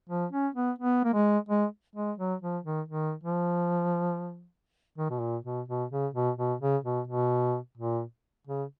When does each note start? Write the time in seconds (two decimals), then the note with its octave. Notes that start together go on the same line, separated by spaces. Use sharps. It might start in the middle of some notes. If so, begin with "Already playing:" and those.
0.09 F3
0.31 C#4
0.55 B3
0.78 B3
1.04 A#3
1.14 G#3
1.49 G#3
1.95 G#3
2.18 F#3
2.42 F3
2.64 D#3
2.88 D#3
3.23 F3
4.98 D#3
5.10 B2
5.20 A#2
5.45 B2
5.68 B2
5.91 C#3
6.14 B2
6.37 B2
6.60 C#3
6.84 B2
7.07 B2
7.77 A#2
8.47 C#3